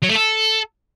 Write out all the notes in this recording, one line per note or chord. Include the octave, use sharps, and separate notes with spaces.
F#3
A3
A4